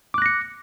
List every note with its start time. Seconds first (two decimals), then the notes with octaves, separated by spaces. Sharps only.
0.14 D6
0.18 F#6
0.22 A#6
0.26 C#7